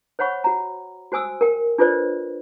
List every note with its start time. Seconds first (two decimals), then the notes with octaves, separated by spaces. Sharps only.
0.19 C5 C#5 F#5 B5 C#6
0.44 F#4 A#5
1.12 F#4 C5 G#5 D#6 E6
1.41 A#4 G5
1.78 D4 F4 A4 B4 C5 D5